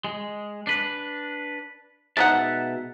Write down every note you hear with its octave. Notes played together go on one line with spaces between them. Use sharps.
G#3
D4 B4
B2 G#3 D#4 E5 F#5 A5